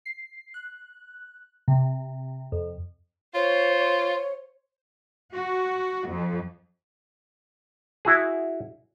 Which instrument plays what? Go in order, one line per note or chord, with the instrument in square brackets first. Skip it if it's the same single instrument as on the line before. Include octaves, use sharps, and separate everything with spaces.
[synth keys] C7
F#6
C3
F2
[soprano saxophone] F4 [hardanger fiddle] C5 [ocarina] C#5
[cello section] F#4
F2
[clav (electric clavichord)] E4 F#4 G#4